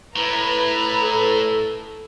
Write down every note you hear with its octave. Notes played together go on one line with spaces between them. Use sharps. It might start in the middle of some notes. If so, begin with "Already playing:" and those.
A2 E4 B4 A#5
A4